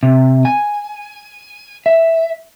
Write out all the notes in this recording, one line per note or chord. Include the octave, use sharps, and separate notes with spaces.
C3
G#5
E5